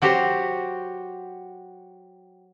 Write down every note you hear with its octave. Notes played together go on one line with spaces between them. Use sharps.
F#3 F#4 G4 C5 A#5